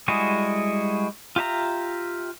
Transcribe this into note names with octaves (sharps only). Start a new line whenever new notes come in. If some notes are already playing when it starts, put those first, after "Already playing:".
G3 G#3 E4 F#4 G#4
F4 G4 E5 A#5